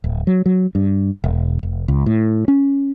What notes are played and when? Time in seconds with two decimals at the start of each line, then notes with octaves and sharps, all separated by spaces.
0.04 D1
0.27 F#3
0.46 F#3
0.75 G2
1.24 E1
1.63 F1
1.88 C#2
2.06 A2
2.48 C#4